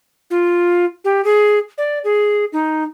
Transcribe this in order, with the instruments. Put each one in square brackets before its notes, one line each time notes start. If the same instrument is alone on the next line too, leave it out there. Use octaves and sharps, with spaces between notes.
[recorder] F4
G4
G#4
D5
G#4
D#4